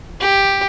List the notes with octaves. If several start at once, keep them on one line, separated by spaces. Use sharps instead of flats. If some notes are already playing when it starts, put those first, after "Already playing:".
G4